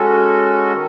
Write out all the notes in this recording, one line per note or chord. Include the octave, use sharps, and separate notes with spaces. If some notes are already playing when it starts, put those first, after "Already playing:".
Already playing: G#3 C#4 F#4 A4
D#3